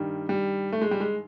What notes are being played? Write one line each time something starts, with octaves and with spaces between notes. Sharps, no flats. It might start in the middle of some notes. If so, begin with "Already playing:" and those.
Already playing: G2 D#3 G3
G3
A3
G#3
G3
G#3